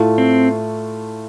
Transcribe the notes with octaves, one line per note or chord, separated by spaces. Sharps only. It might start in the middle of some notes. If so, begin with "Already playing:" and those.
Already playing: A2 A3 F4
C4